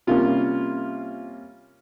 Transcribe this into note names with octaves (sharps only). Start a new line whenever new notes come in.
C3 G3 A#3 C#4 F4